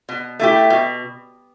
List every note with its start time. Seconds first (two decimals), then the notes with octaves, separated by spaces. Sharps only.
0.09 B2
0.40 A3 E4 G4
0.70 B2